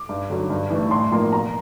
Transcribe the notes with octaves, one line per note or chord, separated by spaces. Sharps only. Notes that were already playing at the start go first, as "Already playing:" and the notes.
Already playing: D6
G2
D3 F#3
G2
E3 A3
A2 C6
F3 A#3 C6
B2 A#5